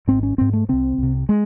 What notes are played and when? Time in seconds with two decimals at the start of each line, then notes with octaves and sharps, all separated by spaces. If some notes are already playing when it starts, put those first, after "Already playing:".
0.07 G#1 G#2 C4
0.23 C#4
0.38 G#1 G#2 C4
0.53 A3
0.69 C2 C3 C4
0.98 C2 C3
1.29 G#3